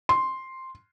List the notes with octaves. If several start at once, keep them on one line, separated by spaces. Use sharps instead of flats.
C6